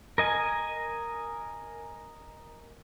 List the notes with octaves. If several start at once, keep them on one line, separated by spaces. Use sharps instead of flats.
A#4 D#5 G#5